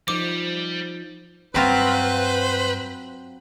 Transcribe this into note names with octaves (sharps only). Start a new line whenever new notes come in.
F3 G3 D#4 D6
G2 F#3 C4 F4 B4 C5